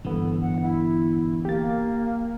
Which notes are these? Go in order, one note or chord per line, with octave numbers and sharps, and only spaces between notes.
G2 B2 D3 E3 B3 A4
F#5
E4
A#3 G4 A6